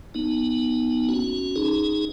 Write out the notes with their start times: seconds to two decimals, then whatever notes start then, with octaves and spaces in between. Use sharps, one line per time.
0.15 B3 D#4
1.09 C#4 F#4
1.56 D#4 G#4